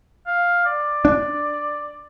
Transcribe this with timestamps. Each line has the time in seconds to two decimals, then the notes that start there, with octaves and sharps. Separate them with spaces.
0.27 F5
0.66 D5
1.05 D4